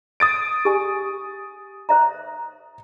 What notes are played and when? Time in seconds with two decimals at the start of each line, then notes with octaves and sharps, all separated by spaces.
0.20 D#6 A6 D7
0.65 G4 G#5
1.89 C5 E5 A#5